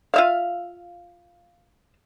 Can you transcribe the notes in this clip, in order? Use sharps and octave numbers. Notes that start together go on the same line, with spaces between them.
F4 E5 F5